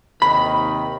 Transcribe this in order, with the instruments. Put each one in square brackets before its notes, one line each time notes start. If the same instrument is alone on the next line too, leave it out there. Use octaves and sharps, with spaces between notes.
[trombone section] D#2 C3 D#3 [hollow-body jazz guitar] B5